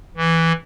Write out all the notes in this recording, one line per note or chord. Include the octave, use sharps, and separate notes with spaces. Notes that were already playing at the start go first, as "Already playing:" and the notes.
E3